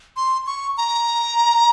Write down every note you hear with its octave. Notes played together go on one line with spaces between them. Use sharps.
C6
C#6
A#5